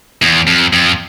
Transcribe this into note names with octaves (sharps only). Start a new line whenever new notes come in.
E2
F2
F2